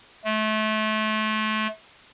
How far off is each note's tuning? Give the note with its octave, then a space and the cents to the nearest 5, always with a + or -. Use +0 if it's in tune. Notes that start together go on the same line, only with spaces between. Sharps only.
A3 -30